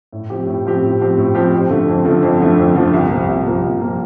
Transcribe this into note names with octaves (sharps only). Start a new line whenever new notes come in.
A2
F3 C4 G4
A2
F3 C4 G4
A2
F3 C4 G4
A2
F3 C4 G4
F2
D3 F3 A3
F2
D3 F3 A3
F2
D3 F3 A3
F2
D3 F3 A3
C2
A#2 F3 A#3
C2
A#2 F3 A#3
C2
A#2 F3 A#3